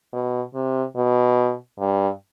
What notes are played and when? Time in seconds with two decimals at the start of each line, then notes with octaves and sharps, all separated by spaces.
0.13 B2
0.54 C3
0.96 B2
1.79 G2